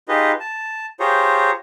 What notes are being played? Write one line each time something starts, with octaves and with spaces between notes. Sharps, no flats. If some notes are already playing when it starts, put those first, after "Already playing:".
D#4 F4 G4 G#4 B4 D#5
A5
F4 G4 G#4 C5 C#5 A#5